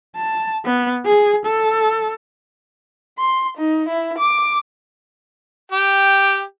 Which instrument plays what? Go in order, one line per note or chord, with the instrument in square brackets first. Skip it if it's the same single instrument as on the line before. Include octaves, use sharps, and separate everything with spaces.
[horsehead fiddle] A5
B3
G#4
A4
[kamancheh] C6
D#4
E4
D6
[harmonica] G4 G5